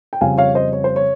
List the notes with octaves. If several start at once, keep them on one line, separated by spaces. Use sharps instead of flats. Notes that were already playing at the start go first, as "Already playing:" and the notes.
G5
F2 C#3 G3 C4 F5 G#5
C#5 F5
C5 D#5
C#5
C5
C#5